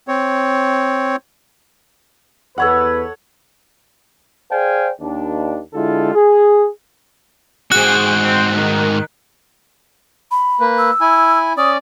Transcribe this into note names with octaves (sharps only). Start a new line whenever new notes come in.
C4 C#5
E2 A4 B4 C#5 F#5
G#4 C5 D5 F5 G5 G#5
D#2 D4
D3 G#3 E4 F4 G4 A4
G#4
G#2 F#4 G#4 C5 G5 F#6
C4
D#3
B5
A#3 B4
E6
E4 G#5
C#4 D5 D#6